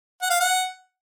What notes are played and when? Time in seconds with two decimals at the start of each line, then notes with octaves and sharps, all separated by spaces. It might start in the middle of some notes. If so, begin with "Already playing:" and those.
0.22 F#5
0.30 F5
0.40 F#5